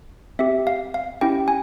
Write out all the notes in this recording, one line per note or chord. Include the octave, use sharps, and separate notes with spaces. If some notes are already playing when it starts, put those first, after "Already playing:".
C4 G4 E5
F5
F5
C#4 E4 G4 G5
G#5